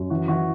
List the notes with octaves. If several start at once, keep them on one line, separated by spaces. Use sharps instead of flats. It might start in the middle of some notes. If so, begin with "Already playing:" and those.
Already playing: F#2
E3 F#4
E3 F#4